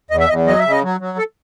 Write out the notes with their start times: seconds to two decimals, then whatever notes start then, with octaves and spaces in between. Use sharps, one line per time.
0.11 E2 D#5
0.20 E5
0.29 E2 D#5
0.47 F#3 D#5
0.59 E5
0.65 C#3
0.71 D#5
0.83 F#3
1.00 F#3
1.18 A4